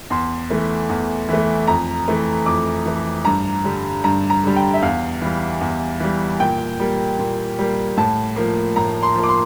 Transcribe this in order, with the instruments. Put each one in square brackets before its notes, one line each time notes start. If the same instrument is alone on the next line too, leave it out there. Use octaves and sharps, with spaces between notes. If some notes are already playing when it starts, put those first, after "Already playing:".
[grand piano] E2 C6
E3 A3
E2
E3 A3
F2 A#5
E3 A3
F2 D6
E3 A3
G2 A#5
D3 G3
G2 A#5
A#5
D3 G3
G5
E5
E2 F5
E3 G3
E2
E3 G3
A#2 G5
G3 A#3
A#2
G3 A#3
A2 A5
F3 A#3
A2 A#5
C6
F3 A#3
D6
C6